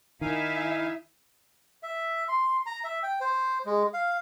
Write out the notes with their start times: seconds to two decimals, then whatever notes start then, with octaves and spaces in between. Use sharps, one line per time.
0.21 D#3 D#4 E4 E5 F5 G#5
1.83 E5
2.29 C6
2.66 A#5
2.84 E5
3.03 G5
3.21 C5
3.66 G#3
3.94 F5